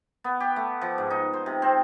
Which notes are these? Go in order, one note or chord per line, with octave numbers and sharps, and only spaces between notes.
B3
G4
A3
F3
G#2
D#4
C5
C3
C4